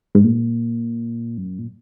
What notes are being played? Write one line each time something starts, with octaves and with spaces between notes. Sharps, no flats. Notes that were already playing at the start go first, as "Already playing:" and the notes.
G#2
A#2
F#2
A#2